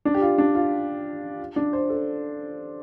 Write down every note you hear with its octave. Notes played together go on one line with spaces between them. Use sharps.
D4
G4
F4
D4
F4
D4
C5
A4